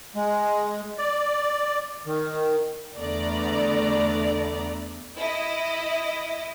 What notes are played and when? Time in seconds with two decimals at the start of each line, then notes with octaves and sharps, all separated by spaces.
0.15 G#3
0.98 D5
2.06 D#3
2.97 E2 D3 A3 B3 D5 A#5
5.19 E4 D#5